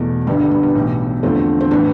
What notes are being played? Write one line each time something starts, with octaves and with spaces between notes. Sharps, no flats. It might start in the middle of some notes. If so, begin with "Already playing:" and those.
Already playing: E2 B2 A3
G1 G2 D3 G3 B3
G3
G3 B3
G3 B3
B1 A2 E3
E2 D3 F3 A3 C4
C4
A2 E3 B3 D4